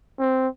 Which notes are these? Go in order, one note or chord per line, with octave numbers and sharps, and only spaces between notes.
C4